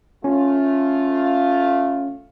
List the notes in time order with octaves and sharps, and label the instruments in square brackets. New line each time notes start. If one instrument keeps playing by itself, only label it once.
[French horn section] A3 F4 [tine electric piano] C#4